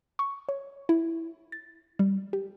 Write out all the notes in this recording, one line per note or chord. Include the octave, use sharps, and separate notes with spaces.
C#6
C#5
E4
A6
G3
G4